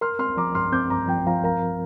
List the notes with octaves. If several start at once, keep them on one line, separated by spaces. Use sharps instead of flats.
A#4 C6 F6
C4 C6 F6
F3 A#5 D6
G2 C6 F6
C4 D6 G6
G2 A#5 D6
F3 G5
F3 F5 A#5
A#4 F5 A#5